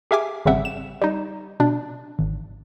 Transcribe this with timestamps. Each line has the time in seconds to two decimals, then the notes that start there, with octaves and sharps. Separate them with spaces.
0.11 G4 G#4 E5 F5 G#5 D6
0.45 G#1 C#3 G3 C4 E5 F#5
0.65 E7
1.02 G3 D#4
1.60 B2 D4
2.19 G#1